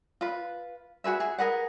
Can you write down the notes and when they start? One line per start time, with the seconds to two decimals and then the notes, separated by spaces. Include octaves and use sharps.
0.21 F4 B4
1.04 F#4 G#4 B4 E5
1.20 G#4
1.38 G#4 A#4 B4 F#5